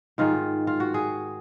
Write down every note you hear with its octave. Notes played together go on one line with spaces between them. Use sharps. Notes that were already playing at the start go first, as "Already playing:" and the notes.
G#2 D#3 G#3 F4
F4
F#4
G#4